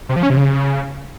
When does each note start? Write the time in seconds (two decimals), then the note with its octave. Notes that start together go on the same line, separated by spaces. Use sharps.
0.09 C3
0.16 F3
0.23 C#4
0.30 C3
0.37 C#3